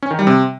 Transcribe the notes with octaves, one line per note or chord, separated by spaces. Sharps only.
C#4
D#3
G3
C3